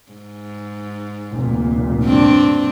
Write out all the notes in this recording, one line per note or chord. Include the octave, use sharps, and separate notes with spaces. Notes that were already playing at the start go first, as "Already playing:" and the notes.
G#2
F1 D2 A#2
G2 C4 D4